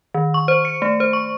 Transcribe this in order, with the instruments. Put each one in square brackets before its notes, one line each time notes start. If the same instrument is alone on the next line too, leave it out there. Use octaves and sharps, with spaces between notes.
[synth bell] D#3
C#6
C5
C#7
A3
C5
C#6